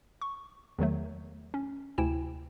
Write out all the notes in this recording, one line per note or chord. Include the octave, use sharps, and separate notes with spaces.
C#6
E2 D#3 F#3 A3
C#4
D2 C3 E4 G5 G#5 E7